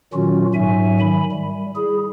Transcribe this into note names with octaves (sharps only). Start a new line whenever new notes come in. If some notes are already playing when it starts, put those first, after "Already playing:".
A#2 D#3 F#3 C#4 F4 F#4
G#2 F#3 E5 G#5
D#3 B5
G3
E4 G#4